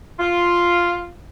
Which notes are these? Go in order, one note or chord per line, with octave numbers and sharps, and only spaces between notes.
F4